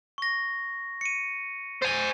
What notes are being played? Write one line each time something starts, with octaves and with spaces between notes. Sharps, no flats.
C#6 A#6
C#7 D#7
C5 G#5 A6 G7